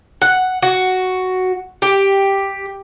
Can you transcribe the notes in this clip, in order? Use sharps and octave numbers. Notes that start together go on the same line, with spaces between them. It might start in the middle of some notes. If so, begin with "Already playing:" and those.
F#5
F#4
G4